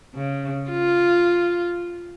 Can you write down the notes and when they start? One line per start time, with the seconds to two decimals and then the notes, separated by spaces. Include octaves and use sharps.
0.14 C#3
0.70 F4